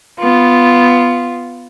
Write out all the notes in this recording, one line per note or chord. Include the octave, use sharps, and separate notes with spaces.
B3 F4